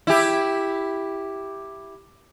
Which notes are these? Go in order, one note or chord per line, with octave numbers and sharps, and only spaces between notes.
E4 G4